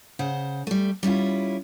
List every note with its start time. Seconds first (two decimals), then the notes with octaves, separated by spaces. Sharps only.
0.19 C#3 C5 F#5
0.67 G3 A3
1.03 G3 C#4 E4 F4